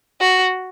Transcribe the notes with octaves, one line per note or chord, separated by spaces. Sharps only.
F#4